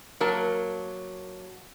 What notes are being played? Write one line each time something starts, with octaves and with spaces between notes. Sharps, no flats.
F#3 A#3 A#4 A5